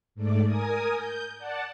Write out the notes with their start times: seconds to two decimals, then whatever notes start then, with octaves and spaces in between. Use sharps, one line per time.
0.15 G#2 A3 D5
0.45 A#4 G#5 D#6
0.94 G6
1.38 D5 F#5 A5